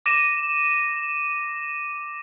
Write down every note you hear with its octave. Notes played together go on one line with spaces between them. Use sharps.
D6 A#6 D#7 E7